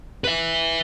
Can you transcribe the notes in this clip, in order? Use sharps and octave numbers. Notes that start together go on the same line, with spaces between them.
B4 E5